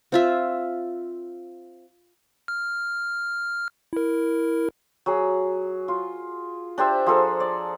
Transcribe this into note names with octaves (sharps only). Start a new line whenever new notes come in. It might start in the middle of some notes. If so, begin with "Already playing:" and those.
C4 F4 E5
F6
E4 A#4
F#3 G#4
F4
D4 G4 C5 E5
F3 G#4 A4 A#5
D5